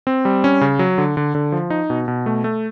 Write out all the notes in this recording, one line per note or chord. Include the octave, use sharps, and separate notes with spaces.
C4
G3
C#4
C#3
F#3
D3
D3
D3
F3
D#4
B2
B2
A3
A3